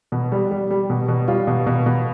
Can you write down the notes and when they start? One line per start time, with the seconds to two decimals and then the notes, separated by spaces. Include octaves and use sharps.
0.12 B2
0.32 G3
0.51 G3
0.71 G3
0.90 B2
1.08 B2
1.28 G3 F4
1.47 B2
1.66 B2
1.86 B2